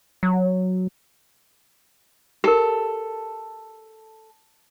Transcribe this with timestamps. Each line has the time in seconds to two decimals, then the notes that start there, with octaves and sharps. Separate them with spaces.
0.23 F#3
2.44 G4 A4 A#4